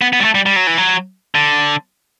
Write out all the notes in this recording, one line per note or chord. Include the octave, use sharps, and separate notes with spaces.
B3
B3
G3
A3
G3
G3
F#3
E3
F#3
D3